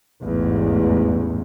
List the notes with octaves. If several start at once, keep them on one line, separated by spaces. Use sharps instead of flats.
A1 E2 G#2